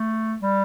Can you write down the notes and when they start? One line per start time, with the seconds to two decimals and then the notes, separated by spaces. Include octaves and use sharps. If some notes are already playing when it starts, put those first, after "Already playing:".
Already playing: A3
0.42 G3